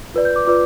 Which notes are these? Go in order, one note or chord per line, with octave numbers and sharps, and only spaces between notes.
F4 B4 D5
G6
D6
F4 B4 D5 D6